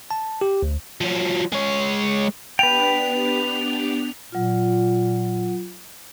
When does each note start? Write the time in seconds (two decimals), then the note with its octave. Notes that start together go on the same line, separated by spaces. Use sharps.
0.11 A5
0.41 G4
0.63 D2
1.01 F3 F#3
1.52 G#3 C#5
2.59 B3 D4 G4 B4 G5 F7
4.32 A#2 F#3 F4